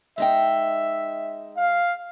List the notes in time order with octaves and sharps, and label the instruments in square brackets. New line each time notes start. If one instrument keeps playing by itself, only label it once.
[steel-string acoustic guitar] G#3 D#4 G5 [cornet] E5
[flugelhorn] F5